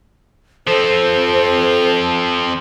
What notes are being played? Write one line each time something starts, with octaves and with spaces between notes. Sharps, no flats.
F3 C4 A4 C5